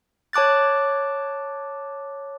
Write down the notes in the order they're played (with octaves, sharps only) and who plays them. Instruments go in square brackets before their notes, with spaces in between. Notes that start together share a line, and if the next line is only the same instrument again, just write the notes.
[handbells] C#5 A5 D6 F#6 A6